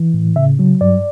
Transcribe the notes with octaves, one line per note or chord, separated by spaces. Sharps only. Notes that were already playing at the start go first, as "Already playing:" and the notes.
Already playing: E3
A2
C#3 E5
F#3
G2 D5